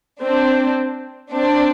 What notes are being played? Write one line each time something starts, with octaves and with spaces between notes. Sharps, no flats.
C4 D4
C4 D4